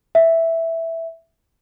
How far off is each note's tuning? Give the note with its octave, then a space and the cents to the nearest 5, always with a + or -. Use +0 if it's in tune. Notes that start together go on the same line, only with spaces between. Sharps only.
E5 +0